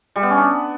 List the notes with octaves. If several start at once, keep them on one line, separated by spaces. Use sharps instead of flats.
G3
B3
C#4
D4